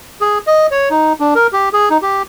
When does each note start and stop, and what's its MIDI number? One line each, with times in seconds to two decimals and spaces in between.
0.21 0.38 68
0.47 0.67 75
0.71 0.89 73
0.90 1.13 63
1.20 1.34 62
1.35 1.47 70
1.53 1.69 67
1.73 1.89 68
1.90 1.98 63
2.02 2.22 67